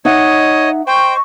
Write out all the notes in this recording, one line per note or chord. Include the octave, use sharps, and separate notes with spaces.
D#4 C#5 D#5 E5 F#5
C5 D#5 G5 C#6